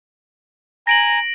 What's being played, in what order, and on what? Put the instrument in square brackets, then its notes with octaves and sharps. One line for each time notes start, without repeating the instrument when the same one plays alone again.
[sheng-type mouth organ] G#5 A#5 [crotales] A#6 D7 F#7